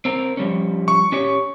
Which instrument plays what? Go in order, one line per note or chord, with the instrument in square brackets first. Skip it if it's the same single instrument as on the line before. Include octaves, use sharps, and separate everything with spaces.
[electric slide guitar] C4 A#4
F3 G3 C#4
[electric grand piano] C#6
[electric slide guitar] C#4 G4 C#5